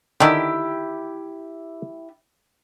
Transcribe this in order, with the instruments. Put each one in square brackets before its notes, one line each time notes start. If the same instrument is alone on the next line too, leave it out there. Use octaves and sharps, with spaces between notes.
[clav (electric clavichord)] D3 D#3 [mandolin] E4 G4